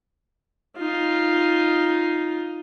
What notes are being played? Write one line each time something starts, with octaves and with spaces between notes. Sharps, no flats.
D#4 F4